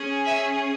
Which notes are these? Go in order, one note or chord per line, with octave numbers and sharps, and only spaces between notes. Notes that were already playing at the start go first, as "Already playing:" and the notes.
Already playing: C#4 G#4
E5 G#5